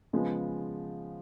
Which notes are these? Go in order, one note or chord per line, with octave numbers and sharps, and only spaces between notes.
C#3 F3 G#3 B3